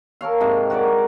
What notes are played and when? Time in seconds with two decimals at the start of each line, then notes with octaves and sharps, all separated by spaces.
0.21 A4 A#4 C#5 F5
0.41 G#2 C3
0.70 F#4 A#4 C#5 D5